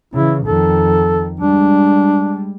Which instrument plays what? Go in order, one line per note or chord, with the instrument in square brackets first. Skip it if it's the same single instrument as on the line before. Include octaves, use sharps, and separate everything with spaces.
[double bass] C#3 E3 [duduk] E4
[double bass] F2 D#3 [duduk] A4
[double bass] G3 G#3 [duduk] D4